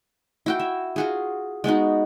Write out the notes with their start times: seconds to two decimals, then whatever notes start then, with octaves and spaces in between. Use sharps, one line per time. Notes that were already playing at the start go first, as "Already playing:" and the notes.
0.46 E4 F#4 G5
0.60 E5
0.96 F4 F#4 G#4
1.64 G#3 B3 D#4 F#4